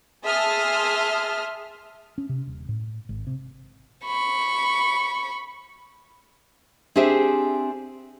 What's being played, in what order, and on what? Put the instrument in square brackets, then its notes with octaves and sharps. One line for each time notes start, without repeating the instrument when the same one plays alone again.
[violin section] G#4 E5 A5 C6 D#6 F6
[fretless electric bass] C#4
C3
D#1
A2
G#1
C3
[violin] B5 C#6
[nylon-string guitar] C4 D4 G4 G#4 C5 E5